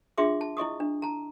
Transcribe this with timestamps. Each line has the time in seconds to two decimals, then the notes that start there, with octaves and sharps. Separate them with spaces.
0.18 D4 F4 G#4 E5 C6 D6
0.41 A5
0.57 E4 D#5 C#6 D#6
0.80 D4
1.02 A5 A#5